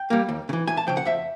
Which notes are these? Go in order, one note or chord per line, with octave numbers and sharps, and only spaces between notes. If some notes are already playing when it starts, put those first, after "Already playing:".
Already playing: G5
G3 A#3
D#2
C#3
E3
E2 G#5
A5
C#3 F3 G5
F#5
F2 E5